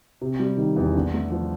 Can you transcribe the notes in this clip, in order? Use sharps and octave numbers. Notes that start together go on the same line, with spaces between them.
C3
G3
D#3
E2
D3
A3
F3